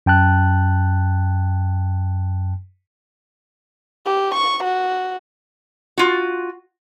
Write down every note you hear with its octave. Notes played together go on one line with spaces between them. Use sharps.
F#2 G5 A5 F#6
G4
C#6
F#4
F4 F#4